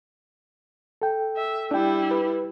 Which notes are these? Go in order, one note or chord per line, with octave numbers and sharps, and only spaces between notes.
A4 G5
E5
G3 D4 E4 G5
B4